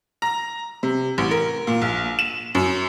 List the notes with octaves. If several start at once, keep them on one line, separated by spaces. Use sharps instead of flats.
A#5
C3
A1
A#4
A#2
A#1
E7
F#2